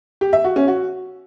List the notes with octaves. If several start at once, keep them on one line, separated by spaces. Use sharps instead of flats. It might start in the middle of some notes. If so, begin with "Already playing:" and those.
G4
E5
F#4
C#4
F#4